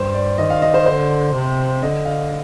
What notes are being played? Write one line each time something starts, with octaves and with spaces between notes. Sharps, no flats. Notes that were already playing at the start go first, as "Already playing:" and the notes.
Already playing: G2 C5
D5
D#3 D#5
F5
D#5
C5
D3 C5
C3
D3 D#5
F5